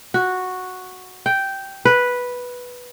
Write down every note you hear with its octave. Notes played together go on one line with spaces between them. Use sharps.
F#4
G5
B4